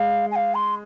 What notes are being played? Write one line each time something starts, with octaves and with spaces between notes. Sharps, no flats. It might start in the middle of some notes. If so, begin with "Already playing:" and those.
Already playing: G#3 F5
G#5
F5
C6